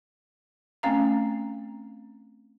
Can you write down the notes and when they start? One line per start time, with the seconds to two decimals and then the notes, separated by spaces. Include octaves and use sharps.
0.83 A3 C4 C#4 F5 A#5